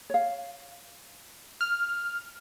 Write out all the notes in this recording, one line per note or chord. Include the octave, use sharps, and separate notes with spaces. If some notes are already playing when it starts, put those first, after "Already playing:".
C#5 F5
F6